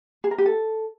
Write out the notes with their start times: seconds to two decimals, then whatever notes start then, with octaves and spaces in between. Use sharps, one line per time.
0.24 G#4
0.31 A#4
0.38 G4
0.46 A4